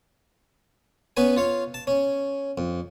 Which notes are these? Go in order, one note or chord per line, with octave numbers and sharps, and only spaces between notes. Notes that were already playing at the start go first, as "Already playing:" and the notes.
B3 C#4 B4 G#5
F4 C#5 F5
A5
C#4
F2